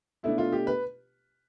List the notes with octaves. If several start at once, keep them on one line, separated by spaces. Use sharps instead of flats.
B2 A3 D4 E4
F4
G4
B4